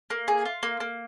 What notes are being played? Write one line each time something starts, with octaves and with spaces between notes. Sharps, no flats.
A#3
G#4
F4
A#3
A#3